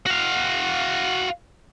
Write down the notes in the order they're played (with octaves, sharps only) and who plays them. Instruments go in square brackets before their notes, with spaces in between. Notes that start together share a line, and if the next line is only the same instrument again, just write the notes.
[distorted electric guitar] F#4 F5